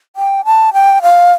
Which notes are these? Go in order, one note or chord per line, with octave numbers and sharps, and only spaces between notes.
G5
A5
G5
F5